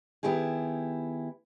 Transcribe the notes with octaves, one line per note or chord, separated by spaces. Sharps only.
D#3 B3 E4 G4 G#4